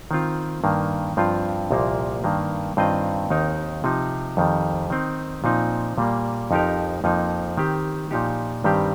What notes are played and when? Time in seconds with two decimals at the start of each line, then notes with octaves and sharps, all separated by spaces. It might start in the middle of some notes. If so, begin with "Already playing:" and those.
0.11 D#3 C4 F4
0.64 G2 D#3 A#3
1.17 G2 F3 C4 F4
1.71 C2 A#2 F3 A#3
2.24 G2 D#3 A#3
2.77 G2 D#3 C4 F4 D#5
3.30 D#2 D#3 C4 D#4 A#4
3.84 C3 F3 D#4
4.37 F2 D#3 G3
4.90 D#3 C4 D#4
5.44 A#2 F3 C4 D#4
5.98 A#2 G3 A#3
6.51 F2 F3 D#4 G4 A#4
7.04 F2 F3 A#3 D#4
7.57 D#3 C4 G4
8.11 A#2 F3 D#4 G4
8.64 G2 D#3 G3 C4 G4